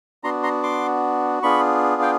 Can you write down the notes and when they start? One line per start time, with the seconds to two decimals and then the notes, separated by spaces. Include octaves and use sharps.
0.24 B3 D4 F#4 A#5 C6
0.43 A#5 C6
0.63 C6 D6
1.42 B3 D4 F4 G#4 B5 C#6
2.02 F5 G5